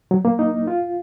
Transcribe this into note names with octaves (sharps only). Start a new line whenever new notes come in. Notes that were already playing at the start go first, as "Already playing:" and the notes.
F#3
A#3
D#4
F4